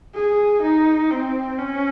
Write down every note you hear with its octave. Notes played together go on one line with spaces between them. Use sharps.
G#4
D#4
C4
C#4